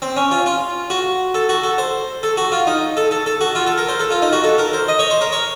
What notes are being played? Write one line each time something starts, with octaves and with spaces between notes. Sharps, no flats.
C4
C#4
F4
F4
F#4
A4
F#4
A4
C5
A4
F#4
F4
D#4
A4
A4
A4
F#4
F4
A4
A#4
C5
A4
F4
D#4
F#4
A4
A#4
C5
D#5
C#5
C5
A#4
C#5